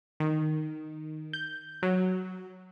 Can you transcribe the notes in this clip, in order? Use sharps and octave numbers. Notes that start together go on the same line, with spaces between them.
D#3
G6
F#3